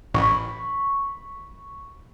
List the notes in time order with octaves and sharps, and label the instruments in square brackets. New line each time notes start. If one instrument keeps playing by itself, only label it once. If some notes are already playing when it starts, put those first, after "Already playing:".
[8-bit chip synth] A1 [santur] B5 C#6